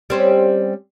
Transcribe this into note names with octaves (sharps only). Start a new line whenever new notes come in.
G3 C4 C#4